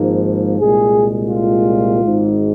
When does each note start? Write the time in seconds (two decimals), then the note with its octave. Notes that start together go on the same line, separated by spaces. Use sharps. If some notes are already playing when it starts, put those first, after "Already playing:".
Already playing: G#1 G#2 F3 A#3
0.60 C2 A#2 G#3 G#4
1.31 F4
2.02 G#1 G#2 G#3